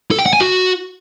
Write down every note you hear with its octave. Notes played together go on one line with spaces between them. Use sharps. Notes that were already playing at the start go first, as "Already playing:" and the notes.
A4
G5
F#5
G#5
F#4